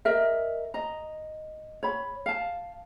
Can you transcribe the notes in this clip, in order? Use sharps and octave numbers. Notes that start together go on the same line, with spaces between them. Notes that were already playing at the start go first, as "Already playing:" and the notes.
A#4 D#5 E5
D#5 A#5
C#5 B5
F5 A5